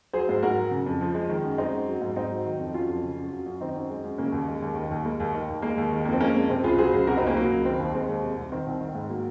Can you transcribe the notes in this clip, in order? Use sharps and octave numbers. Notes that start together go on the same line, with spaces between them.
F#3 G#4 C5
G#2
G#2 F#4 A#4
F#3
C#3
F2
F3
G#3
D#3
F#2
G#3 C4 D#4
F#2
F#3
G#2
G#2 C4 D#4
F#3
D#3
F2
F#3 C#4 F4
F2
C#3
F#2
F#3
F#2
D#3 C4 D#4
F#2
G#3
F#2
C#3 A#3 C#4
D#2
G#3
D#2
D#3
D#2
G#3 A#3
D#2
D#3
D#2
G#3 A#3
D#2
D#3
F2 A#3
C4
G#3 A#3 C#4
F2
C3 C4
C#2 F4 G#4
F#3 G#4 C5
C#2
C3 F#4 A#4
C4 D#4
C#2 A#3 C#4
F#3 A#3
C#2
D#3 C4
D#2
G#3 C4
D#2
C3
C2
D#3 C4
C2
D#3
G#2
F#3 A#3